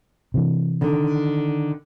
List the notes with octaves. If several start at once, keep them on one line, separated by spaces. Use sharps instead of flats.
C3 E3
D3 D#3